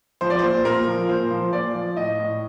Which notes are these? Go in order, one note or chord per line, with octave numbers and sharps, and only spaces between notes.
F3 C5
D5
A#2 C5
A#2 A#4
F3
A#2 C5
F3
A#2 D5
F3
A2 D#5
A2